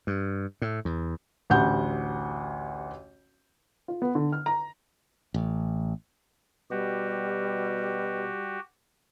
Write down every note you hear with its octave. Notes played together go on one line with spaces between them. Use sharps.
G2
A2
E2
A1 D2 G4 F#5 G6
F4
B3
D3
F6
A#5
A1
B2 G3 F#4 G4